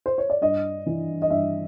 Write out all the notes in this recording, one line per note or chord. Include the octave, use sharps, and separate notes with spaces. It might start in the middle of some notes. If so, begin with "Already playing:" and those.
C5
C#5
D5
G2 D#5
E3
D#5
G2 E5